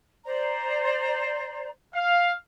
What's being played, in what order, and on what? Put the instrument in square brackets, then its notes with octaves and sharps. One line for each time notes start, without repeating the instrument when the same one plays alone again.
[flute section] C5 D5 A#5
[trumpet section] F5